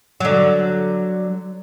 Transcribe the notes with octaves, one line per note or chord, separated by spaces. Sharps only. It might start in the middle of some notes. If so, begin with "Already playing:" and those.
D3 F#3